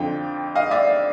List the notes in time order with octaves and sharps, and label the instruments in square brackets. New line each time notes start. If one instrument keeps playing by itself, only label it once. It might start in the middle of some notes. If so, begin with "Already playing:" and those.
Already playing: [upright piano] F2 D3 F3 G5
D#5 F5
D5 E5